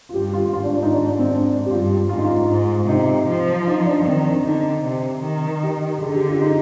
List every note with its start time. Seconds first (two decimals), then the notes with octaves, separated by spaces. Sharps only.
0.09 F4
0.14 G2 G4
0.34 F4
0.53 G#2 F4
0.63 D4
0.75 D4
0.82 D#4
0.93 D4
1.05 D4
1.19 C4
1.31 D4
1.66 G4
1.70 G2 F4
2.09 G#2 F4
2.18 D#4
2.24 F4
2.49 G#2
2.88 C3 D#4
3.27 F3
3.67 D#4
3.86 D4
4.06 D#3 C4
4.26 D4
4.45 D3 D#4
4.84 C3
5.23 D#3
5.63 G4
6.02 D3 G#4
6.15 G4
6.28 F4
6.41 D#4